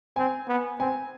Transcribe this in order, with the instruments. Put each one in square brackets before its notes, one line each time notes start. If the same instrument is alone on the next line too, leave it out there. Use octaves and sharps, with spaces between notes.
[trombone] C4 [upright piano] G#5
[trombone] B3
[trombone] C4 [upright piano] G#5